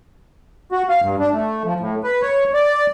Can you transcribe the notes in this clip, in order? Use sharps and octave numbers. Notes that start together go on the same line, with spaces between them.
F#4
F5
G2
D4
A3
F3
A2
B4
C#5
D5